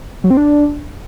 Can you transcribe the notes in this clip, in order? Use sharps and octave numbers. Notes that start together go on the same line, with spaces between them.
F#3
C4
D4